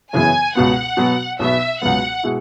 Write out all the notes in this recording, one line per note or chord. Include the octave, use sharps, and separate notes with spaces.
F#2 C#3 E3 B3 G#4 G#5
C#2 B2 B3 F#5
B2 F#3 B3
B1 B2 B3 E5
C#2 B2 F#3 B3 F#5
B2 G#3 E4